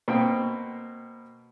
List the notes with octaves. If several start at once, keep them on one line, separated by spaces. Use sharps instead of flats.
B2 A#3 C4 G5